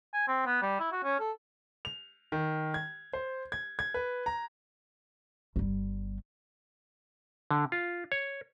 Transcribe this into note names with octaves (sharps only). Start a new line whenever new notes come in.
G#5
C4
B3
G3
E4
F#4
C#4
A4
F7
D#3
G#6
C5
G#6
G#6
B4
A#5
G1 G3
D3
F4
C#5